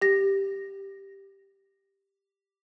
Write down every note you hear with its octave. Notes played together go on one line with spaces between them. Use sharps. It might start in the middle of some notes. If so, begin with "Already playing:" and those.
G4 A#6